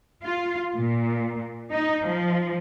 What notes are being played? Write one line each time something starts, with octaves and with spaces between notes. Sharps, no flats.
F4
A#2
D#4
F3